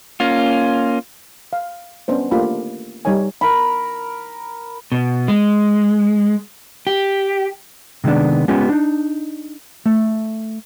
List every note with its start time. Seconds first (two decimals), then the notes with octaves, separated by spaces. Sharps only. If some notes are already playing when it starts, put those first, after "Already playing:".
0.20 A#3 C#4 F4
1.53 F5
2.08 B3 C#4 D4 C5
2.31 A3 A#3 D4 F4 G4 B5
3.05 G3 D#4 A#4 C#5 G#5
3.41 A#4 B5
4.92 B2
5.28 G#3
6.87 G4
8.04 C3 D#3 G#3 B3 D4
8.48 G#3 B3 C#4 F4 G4
8.69 D4 D#4
9.86 A3